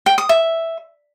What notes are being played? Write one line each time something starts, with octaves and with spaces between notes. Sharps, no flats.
G5
D#6
E5